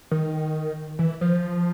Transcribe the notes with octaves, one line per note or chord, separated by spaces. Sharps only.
D#3
E3
F3